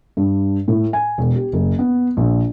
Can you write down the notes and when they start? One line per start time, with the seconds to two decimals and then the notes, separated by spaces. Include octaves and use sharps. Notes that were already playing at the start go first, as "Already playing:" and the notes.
0.17 G2
0.68 A2
0.93 G#5
1.18 E1
1.36 G4
1.53 F#1
1.79 B3
2.17 A#1